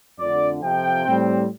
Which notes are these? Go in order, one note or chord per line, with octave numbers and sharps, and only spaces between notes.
F2 D3 A3 D5
F2 C3 F3 G5
A2 G3 C4